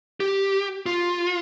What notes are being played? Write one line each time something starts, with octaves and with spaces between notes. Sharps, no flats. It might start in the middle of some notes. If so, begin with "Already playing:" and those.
G4
F4